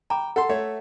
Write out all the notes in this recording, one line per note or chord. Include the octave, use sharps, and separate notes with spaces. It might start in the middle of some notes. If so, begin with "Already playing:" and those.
G5 A#5 B5 D6
A4 F#5 C6
A3 C#5 E5